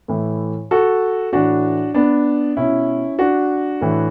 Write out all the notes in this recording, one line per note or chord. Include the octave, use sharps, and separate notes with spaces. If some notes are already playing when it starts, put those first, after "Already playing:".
A2 E3
F#4 A4
A2 E3 D4 F#4
B3 D4
B2 C#4 E4
D4 F#4
A2 E3